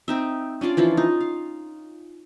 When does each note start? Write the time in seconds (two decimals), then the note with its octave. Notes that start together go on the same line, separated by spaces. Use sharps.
0.08 C4 D#4 E5
0.61 C#4 D4 F4 D5
0.77 E3 F3 E4 F4
0.97 D#4
1.21 F5